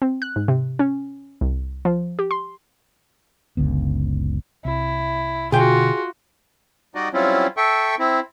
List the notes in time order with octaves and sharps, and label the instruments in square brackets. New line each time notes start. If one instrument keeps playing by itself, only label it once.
[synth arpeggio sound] C4
F#6
G#2
C3
C#4
C2
F3
G4
C6
[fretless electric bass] F#1 C#2 D3 B3
[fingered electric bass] C2 [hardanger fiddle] E4
[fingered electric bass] B2 D3 [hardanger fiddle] F4 F#4 [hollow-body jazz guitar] G#4 G5
[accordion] G3 D#4 F#4 D5 D#5
F#3 G3 C4 C#4 E4 F4
A4 E5 G5 C#6
C4 E4